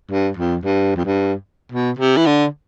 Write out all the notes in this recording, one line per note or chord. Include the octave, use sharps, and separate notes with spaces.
G2
F2
G2
F2
G2
B2
C3
E3
D3